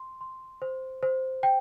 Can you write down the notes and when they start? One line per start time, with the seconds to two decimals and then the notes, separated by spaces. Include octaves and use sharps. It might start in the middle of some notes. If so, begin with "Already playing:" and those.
Already playing: C6
0.21 C6
0.62 C5
1.03 C5
1.43 G5